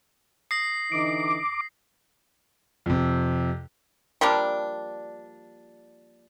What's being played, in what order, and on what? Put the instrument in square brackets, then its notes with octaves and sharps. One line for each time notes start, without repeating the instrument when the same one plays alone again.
[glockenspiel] D#6 A#6 F#7 [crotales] C7
[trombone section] D3 E3 D#4 [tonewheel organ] D6
[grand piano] F2 C3
[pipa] F3 G3 A#3 D4